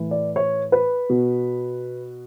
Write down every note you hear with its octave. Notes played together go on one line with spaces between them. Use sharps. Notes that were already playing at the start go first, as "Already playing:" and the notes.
Already playing: A2 E3
D5
C#5
B4
B2